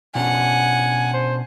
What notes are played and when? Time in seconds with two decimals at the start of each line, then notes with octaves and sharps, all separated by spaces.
0.15 B2 C#4 D4 F#5 G#5
1.14 C5